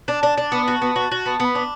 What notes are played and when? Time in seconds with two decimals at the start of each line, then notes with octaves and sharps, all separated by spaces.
0.08 D4 A5
0.23 D4
0.38 D4
0.52 B3
0.68 F#4
0.82 B3
0.96 F#4
1.12 F#4
1.26 B3 A5
1.40 B3 B5
1.55 D4